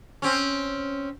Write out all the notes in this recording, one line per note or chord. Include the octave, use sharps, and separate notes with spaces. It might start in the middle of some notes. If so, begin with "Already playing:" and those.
C4 C#4